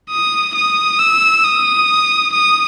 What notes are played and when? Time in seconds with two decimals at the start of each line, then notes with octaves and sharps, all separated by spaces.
0.10 D#6
0.55 D#6
0.99 E6
1.44 D#6
2.34 D#6